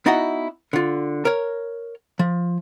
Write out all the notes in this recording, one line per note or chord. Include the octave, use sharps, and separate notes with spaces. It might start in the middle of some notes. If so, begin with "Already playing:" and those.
B3 D#4 E4 F#4 D#5 F#5
D3 F4
A#4 C#5
F3